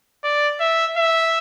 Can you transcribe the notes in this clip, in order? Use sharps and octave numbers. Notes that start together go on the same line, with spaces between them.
D5
E5
E5